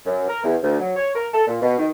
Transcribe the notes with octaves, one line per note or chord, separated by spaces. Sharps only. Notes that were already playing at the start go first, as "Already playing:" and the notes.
F#2
A#4
E2
D2
F#3
C#5
A#4
A4
A#2
B2
D#3